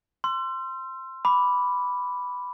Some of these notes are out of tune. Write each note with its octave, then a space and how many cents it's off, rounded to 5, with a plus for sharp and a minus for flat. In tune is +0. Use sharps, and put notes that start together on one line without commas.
C6 +0 E6 +40
B5 +0 D6 -10